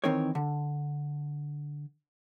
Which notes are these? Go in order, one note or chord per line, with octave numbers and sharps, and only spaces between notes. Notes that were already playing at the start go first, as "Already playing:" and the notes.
D#3 E3 C4 D#4 A#4 C#5
D3